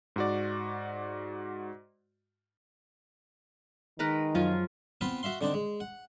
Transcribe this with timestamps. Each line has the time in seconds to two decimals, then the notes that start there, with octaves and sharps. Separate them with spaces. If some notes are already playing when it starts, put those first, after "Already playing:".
0.16 G#2 F#4 D5
3.99 D#3 G#3 A#4 B4 A#5
4.35 F#2 F3 F#3 F4 G#5
5.01 B3 C4 F4 B4 F5
5.23 F#4 E5 F5 C6
5.41 D3 C4 D4 D#4
5.54 G#3
5.80 F#5